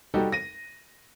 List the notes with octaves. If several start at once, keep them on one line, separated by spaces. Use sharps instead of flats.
G3 D#4 F#4 G4 A4
A#6 D#7